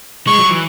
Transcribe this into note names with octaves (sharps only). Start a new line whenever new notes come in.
G#3 C#6
F#3
E3